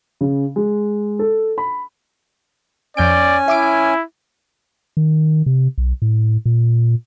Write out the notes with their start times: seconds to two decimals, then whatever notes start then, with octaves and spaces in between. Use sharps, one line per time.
0.21 C#3
0.56 G#3
1.19 A4
1.58 B5
2.97 F2 C#4 D5 G#5 G6 D7
3.48 E4 E5 D6 D7
4.97 D#3
5.46 C3
5.78 B1
6.02 A2
6.46 A#2